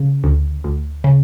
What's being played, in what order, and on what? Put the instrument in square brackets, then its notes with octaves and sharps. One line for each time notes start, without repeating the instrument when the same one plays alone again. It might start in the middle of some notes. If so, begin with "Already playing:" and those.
Already playing: [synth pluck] C#3
D2
D2
C#3